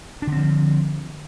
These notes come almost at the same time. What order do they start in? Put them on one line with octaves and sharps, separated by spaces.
D4 D3 C4 F3